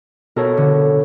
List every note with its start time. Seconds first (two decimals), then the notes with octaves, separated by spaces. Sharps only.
0.36 B2 A4 A#4 C#5
0.57 D3